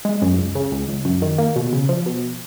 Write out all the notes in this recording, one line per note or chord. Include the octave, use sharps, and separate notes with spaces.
G#3
F#2
C#2
C#3
C#2
C#2
F#2
D#3
A#3
B2
C#3
F3
B2